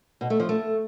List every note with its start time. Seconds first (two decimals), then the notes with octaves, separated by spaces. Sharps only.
0.21 B2
0.30 A3
0.40 F3
0.49 A3